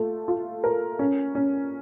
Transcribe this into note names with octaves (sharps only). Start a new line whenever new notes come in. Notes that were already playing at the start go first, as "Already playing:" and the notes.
Already playing: A3 F4
F4
A#4
C#4
C#4